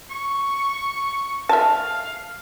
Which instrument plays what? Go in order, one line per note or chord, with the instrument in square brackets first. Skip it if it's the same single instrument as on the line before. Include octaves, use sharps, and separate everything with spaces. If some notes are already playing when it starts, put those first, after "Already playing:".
[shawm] C#6
[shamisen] E5 A5 [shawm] F5